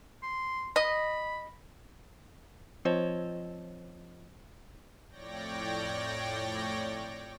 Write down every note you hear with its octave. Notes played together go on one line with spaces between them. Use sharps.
C6
D#5 B5
F3 C4 F4 C5 C#5 D#5
F2 A2 C#5 D5 G5 A#6